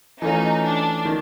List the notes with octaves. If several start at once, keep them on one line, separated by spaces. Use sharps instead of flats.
E3 A3 C#4 D#4 F4
D4
D#3